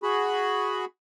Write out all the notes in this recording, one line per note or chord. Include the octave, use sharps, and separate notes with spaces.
F#4 G#4 B5